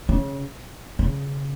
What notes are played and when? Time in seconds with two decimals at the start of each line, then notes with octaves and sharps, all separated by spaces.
0.09 C#3
0.99 C#3